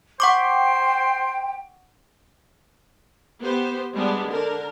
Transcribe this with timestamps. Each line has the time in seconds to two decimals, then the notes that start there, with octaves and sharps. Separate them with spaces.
0.20 C5 F#5 G5 C#6 D6
3.41 B3 G4 C5
3.93 G3 G#3 B3 D4
4.27 D3 D4 A#4